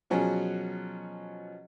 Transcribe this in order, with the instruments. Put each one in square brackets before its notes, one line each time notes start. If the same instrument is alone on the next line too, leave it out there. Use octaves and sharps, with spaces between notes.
[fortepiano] B2 F3 F#3 C#4 F#4 G#4